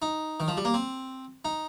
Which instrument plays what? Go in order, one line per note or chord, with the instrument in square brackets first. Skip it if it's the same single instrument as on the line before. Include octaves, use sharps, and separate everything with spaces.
[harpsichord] D#4
D#3
F3
G3
A#3
C4
D#4